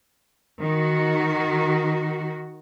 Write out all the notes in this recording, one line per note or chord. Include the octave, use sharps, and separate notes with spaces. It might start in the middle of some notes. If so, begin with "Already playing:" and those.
D#3 F#4